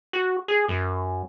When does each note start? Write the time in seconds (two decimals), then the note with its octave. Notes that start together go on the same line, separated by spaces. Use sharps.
0.13 F#4
0.48 G#4
0.68 F#2